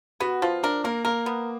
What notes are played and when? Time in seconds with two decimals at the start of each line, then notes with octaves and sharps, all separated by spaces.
0.20 B3 F#4
0.42 F3 F4
0.63 D4 A#4
0.84 A#3 A#4
1.05 A#3 A#4
1.26 B3